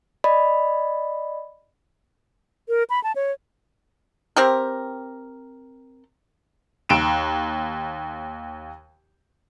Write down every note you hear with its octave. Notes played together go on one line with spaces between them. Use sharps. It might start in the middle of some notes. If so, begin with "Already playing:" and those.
D5 D#5 B5
A#4
B5
A5
C#5
C4 G4 A#4
D#2 D7 E7